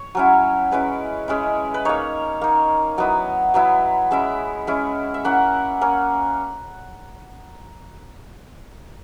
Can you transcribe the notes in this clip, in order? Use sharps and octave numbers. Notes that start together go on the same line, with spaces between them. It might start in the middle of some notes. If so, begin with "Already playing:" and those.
Already playing: C#5
F#3 C#4 E4
G#3 C#4 E4 B4
G#3 C#4 E4
B4
A#3 D#4 C#5
A#3 D#4
F#3 B3 E4 D#5
F#3 B3 E4
G#3 C#4 E4 E5
G#3 C#4 E4
E5
A#3 C#4 E4 F#5
A#3 C#4